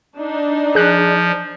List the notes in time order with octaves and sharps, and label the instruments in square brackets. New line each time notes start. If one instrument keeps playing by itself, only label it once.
[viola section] D4 D#4
[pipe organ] F3 [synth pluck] G#4 F#6